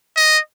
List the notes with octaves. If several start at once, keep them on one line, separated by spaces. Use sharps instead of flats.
D#5